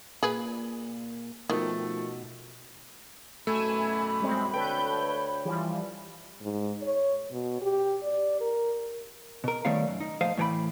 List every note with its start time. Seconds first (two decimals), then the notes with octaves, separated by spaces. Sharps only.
0.23 A#2 G#4 B4
1.50 B2 D#3 F3 A3
3.47 F#2 B2 E3 A3 G#5 B5 E6
4.20 G3 G#3 C4
4.54 D2 A4 B4 C#5 G5 G6
5.45 E3 F3 G3
6.41 G#2
6.82 C#5
7.31 B2
7.62 G4
8.03 D5
8.41 A#4
9.44 B2 A#4
9.65 D#3 G3 A3 B3 C#5 F5
9.87 F#2
10.00 D#4
10.21 A#2 F3 A3 C5 D#5 F5
10.38 A2 E3 C#5 D5 G5 B5